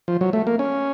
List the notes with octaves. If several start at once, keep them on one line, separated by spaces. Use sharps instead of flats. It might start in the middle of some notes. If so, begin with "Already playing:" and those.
F3
F#3
A3
A#3
C#4